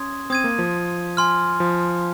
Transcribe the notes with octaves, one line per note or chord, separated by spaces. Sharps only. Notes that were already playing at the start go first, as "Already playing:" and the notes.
Already playing: C#4 C6 D#6 G#6
C4 D#6 G#6 D#7
A#3
F3
G#5 C6 F6
F3